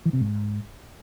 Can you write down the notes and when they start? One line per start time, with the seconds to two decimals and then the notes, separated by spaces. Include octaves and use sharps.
0.06 E3
0.13 C3
0.21 G#2